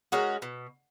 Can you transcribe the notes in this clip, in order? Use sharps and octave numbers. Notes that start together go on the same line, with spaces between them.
G#3 C#4 F#4 A#4
B2